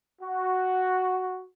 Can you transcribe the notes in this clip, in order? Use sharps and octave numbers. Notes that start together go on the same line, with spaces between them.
F#4